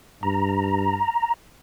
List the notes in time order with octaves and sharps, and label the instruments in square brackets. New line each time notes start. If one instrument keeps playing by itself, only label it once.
[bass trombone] G2 [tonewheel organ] A#5